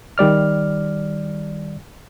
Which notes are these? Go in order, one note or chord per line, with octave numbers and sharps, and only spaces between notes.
D#3 G3 D5 F6